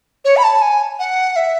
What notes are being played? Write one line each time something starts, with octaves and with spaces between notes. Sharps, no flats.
C#5
B5
A5
G#5
F#5
E5